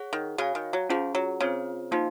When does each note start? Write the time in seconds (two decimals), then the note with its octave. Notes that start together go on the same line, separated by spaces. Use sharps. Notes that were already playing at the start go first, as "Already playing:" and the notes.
Already playing: G#4 C#5 F#5
0.13 D#3
0.38 C#3 F#4 C#5 F5 G#5
0.55 D#3
0.73 F#3
0.90 F3 C#4 F4 G#4
1.15 F#3
1.40 C#3 C4 F4 C5
1.91 F3 A#3 D#4